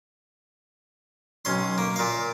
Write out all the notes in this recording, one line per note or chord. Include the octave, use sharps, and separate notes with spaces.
B1 C#4 C6
A#3
A#2 F5